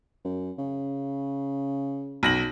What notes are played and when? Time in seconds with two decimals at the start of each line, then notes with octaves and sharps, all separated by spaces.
0.25 F#2
0.58 C#3
2.23 B1 A#6 F#7